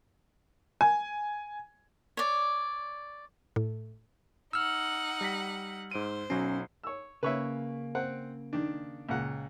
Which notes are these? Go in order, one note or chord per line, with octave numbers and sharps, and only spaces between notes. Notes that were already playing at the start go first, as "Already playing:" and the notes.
G#5
C#5 D5
A2
D#4 F#5 E6 F6
G3 A#6 B6
G#2 C5 D7 D#7
B1 F#3 C#4 C7
C#5 E6
C#3 A#3 B4 C#5 E5
C4 F#5
D#3 D4
C#2 A#2 F#5